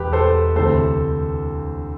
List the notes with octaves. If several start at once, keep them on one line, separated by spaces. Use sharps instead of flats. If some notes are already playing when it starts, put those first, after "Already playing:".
Already playing: E1 E2 G4 B4
A4 C5
D2 C3 E3 A4 C5